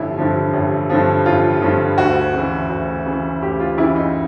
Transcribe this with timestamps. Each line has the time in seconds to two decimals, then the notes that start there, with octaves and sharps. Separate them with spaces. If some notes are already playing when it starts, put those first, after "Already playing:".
Already playing: A1 G2 D3 F3 D#4 E4
0.17 G2 D3 F3
0.53 A1
0.90 G2 D3 F3
1.26 A1 F4
1.62 G2 D3 F3
1.98 D2 F#4
2.34 C#3 E3
2.70 D2
3.06 C#3 E3
3.42 D2 G4
3.60 F4
3.78 C#3 E3 E4
3.96 D#4